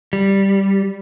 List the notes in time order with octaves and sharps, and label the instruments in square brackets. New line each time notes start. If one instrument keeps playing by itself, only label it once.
[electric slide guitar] G3